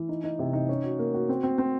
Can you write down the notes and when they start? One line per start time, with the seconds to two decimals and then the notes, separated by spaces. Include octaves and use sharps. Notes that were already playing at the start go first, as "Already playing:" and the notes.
Already playing: E3
0.09 D#4
0.24 D#4
0.39 C3
0.53 D#4
0.69 C#4
0.84 F#4
0.99 A#3
1.14 F#4
1.29 C4
1.43 C4
1.58 C4